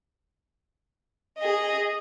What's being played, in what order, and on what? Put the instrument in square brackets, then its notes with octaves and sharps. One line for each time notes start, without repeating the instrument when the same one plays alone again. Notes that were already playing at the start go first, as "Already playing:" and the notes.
[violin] G#4 D#5